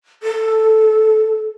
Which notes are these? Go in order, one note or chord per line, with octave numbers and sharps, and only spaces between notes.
A4